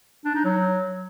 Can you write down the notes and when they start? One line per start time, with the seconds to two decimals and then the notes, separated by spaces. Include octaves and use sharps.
0.25 D4
0.34 D#4
0.44 F#3